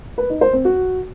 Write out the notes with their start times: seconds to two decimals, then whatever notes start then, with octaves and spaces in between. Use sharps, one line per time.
0.18 B4
0.29 D#4
0.41 C5
0.53 C4
0.65 F#4